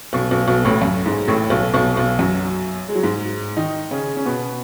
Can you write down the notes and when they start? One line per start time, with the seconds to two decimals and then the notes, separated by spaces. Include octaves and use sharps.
0.13 B1 B2
0.31 B1 B2
0.47 B1 B2
0.65 A1 A2
0.82 F#2
1.06 G#2
1.28 A1 A2
1.50 B1 B2
1.73 B1 B2
1.96 B1 B2
2.19 F#2 F#3
2.89 G#3
2.95 F#3
3.03 G#2 G#3
3.57 D#3 D#4
3.91 C#3 C#4
4.17 C#4
4.25 B2 B3